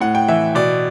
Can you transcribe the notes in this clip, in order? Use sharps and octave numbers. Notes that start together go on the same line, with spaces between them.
A2 F#5
G5
E3 E5
B2 D5